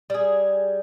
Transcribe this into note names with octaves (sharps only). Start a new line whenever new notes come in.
G3 G#4